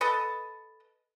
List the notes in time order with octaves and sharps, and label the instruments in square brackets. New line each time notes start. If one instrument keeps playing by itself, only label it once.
[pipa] A4 B4 D#5 A5